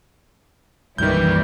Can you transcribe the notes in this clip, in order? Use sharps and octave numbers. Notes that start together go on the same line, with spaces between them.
B1 F#2 A#2 D#3 E3 G3 E4 G6